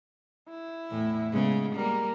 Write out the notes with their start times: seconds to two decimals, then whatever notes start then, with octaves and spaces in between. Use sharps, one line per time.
0.50 E4
0.91 E2 A2
1.33 C#3 G#3 B3
1.76 G3 A#3 A#4